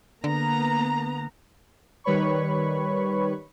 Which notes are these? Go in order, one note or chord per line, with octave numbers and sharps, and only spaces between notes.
D3 A#3 B3 A#5
D#3 G3 B4 C#5 B5 C#6